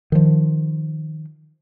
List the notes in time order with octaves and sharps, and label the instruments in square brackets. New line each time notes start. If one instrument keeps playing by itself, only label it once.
[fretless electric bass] D#3 F3